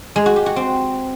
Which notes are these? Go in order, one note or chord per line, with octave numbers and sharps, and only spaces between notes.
G#3
F#4
G4
F#4
C4